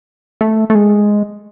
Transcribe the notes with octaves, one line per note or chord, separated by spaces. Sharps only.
A3
A3
G#3